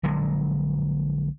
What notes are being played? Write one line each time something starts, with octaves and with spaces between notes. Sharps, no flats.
A#1 D3 F#3 G#3